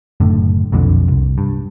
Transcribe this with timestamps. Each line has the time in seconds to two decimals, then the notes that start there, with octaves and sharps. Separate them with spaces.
0.20 F#1 F#2 A2 D3
0.72 B1 F2 A#2 D3
1.08 C2
1.38 G2